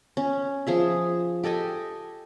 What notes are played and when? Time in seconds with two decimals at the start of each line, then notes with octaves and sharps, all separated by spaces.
0.17 C#4
0.67 F3 G#4 E5
1.44 G4 A4 D#5 G#5